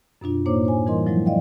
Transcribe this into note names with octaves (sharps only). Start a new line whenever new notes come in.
F#2 B2 D4 F4
A2 A#3 D#4 C5 C#5 D6
C5 G#5
E3 G3 E4 A#4 D#5 C6
F3 F#3 G#3 E4
D5 D#5 F5 G5